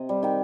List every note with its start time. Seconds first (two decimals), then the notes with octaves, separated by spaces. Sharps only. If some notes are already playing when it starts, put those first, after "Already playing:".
Already playing: C3 D#5
0.09 G3
0.23 D#3 G5